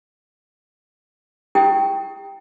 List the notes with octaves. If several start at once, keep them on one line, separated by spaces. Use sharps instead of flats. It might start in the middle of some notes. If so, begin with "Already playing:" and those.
E4 G4 G5